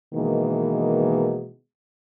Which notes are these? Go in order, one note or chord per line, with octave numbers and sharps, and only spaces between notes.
B2 D#3 E3 G#3 A#3